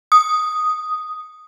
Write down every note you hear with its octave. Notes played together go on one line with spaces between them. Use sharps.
D#6